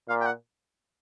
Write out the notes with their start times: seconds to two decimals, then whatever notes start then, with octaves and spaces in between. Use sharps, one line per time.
0.09 A#2 F5
0.21 G5
0.26 F#5